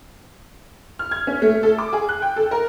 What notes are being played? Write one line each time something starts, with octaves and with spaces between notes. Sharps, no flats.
F6
G#6
C#4
A3
A4
D6
G#4
F#6
G5
A4
A#4